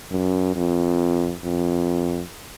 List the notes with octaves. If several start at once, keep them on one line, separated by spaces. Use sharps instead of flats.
F#2
F2
F2